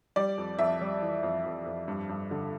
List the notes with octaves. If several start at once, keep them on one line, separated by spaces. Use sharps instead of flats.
G3 D5
F2
F2 E5
G3
E3
F2
F2
F2
G2
G2
D3